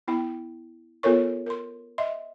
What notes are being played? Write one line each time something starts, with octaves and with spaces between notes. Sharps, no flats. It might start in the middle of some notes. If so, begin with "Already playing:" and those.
B3 E4 G5
B3 F4 A4 A#4 C#5 C#6
A#4 C6
D#5 E5 C6